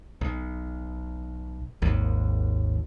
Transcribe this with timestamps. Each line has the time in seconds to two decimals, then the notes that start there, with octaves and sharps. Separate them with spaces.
0.21 B1
1.82 G#1 D#2